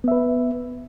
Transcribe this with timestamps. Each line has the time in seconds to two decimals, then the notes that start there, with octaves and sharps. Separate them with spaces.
0.04 B3
0.08 E5
0.12 B4